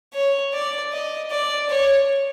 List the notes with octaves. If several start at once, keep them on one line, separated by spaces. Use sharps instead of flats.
C#5
D5
D#5
D5
C#5